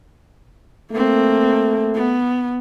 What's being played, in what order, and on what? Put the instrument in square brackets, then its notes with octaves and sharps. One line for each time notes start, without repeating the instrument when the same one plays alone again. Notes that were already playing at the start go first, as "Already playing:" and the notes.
[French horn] A3 [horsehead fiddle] A#3 C4
[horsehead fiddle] B3